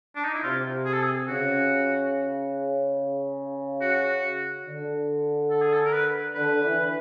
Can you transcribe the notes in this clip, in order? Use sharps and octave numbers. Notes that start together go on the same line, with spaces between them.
D4
D#4
E4
C3 F4
G#4
A4
G#4
C#3 F#4
F#4
D3
A4
G#4
A4
A#4
B4
D3 B4
E3